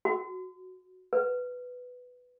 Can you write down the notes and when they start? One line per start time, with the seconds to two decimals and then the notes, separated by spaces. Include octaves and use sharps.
0.05 F#4
1.13 B4